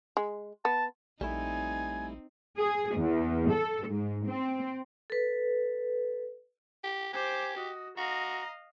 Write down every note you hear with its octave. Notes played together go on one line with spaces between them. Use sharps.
G#3
B3 A5
A#1 G3 A3 C4 D#4 E4 G#5
G#4
E2
A4
G#2
C4
A4 B4
G4
G4 C5 G#5 D6
F#4 D#5
F#4 D#5 F5 A#5